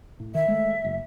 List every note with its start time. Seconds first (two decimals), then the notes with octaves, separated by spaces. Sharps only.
0.20 A2
0.35 D#3 E5
0.48 G#3 A3
0.85 F#1